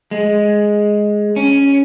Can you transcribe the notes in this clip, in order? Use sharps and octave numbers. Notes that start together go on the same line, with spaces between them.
G#3
C#4